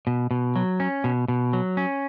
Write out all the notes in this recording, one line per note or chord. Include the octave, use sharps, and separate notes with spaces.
B2
B2
F#3
C#4
B2
B2
F#3
C#4